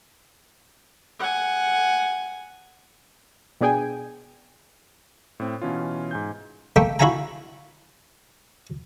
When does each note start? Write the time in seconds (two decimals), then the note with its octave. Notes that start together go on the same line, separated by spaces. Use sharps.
1.20 F#5 G#5
3.61 B2 B3 D4 G#4 G5 G#5
5.40 A2 C4
5.61 B2 E3 C#4 F4
6.11 G#2 G#5 G6
6.76 A3 A#3 E5 G5
6.99 E4 F#4 E5 F5 G#5 A#5